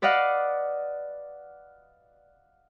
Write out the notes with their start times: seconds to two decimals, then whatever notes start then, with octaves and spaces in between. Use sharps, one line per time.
0.02 B4 D5 D#5 F5 F#5